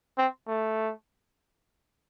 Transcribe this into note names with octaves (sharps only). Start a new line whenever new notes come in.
C4
A3